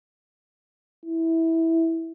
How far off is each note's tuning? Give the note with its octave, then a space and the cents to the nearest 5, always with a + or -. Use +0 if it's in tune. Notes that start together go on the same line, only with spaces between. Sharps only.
E4 -10